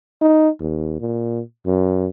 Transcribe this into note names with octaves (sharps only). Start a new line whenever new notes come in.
D#4
D#2
A#2
F#2